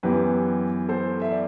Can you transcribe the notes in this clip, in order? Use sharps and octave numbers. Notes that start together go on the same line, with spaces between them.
F#2 E3 B3 G4 B4
A4 C5
E5
D5